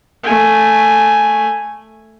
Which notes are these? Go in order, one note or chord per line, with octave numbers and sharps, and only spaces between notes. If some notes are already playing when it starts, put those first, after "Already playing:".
A3 G#5